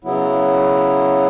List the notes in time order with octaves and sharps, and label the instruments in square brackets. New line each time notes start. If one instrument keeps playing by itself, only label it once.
[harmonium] C#3 F#3 B3 E4